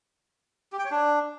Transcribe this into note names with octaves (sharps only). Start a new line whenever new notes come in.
G4
G5
C#5
D4